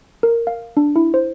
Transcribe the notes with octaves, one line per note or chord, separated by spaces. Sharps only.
A#4
F5
D4
E4
C5